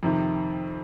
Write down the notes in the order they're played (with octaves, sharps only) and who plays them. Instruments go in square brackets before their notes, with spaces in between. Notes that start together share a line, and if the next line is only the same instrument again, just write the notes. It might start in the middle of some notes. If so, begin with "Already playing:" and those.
[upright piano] F2 C3 D#3